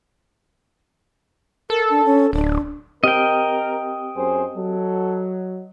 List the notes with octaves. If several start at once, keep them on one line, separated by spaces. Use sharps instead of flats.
A4 A#4
D4
C#4
D1 D4
C4 G4 A#4 D#5 G5 F6
F#2 G#4 C5
F#3 A4